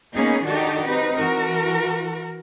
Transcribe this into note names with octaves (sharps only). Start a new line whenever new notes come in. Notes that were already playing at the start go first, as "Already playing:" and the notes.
A#3 B3 C#4 D#4 G#4
D#3 D4 D#4 F#4 G4 A4
C4 D#4 B4
E3 F#4 A#4